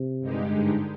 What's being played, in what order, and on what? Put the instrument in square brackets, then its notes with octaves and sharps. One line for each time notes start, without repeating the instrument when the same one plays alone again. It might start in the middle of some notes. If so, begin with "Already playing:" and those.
Already playing: [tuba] C3
[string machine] G2 D3 G#3 D#4 G4
[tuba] G#2